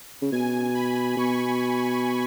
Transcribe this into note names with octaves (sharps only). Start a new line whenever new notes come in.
C#3
B2 G#5
B5
B2 C#6